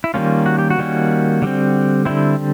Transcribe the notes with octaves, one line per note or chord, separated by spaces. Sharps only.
E4
D#3 G3 A#3 C#4 F4
F#4
G4
F#4
D#3 G3 A#3 C#4
D3 G3 C4
D3 G3 C4 E4